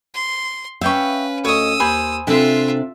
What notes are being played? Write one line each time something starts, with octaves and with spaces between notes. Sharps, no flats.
C6
C#4 B4 E5 F5 G5 C#6
D2 C#5 D#5 D#6 E6
D#2 C5 G#5 B5
C3 D4 F4 A4 E5 G5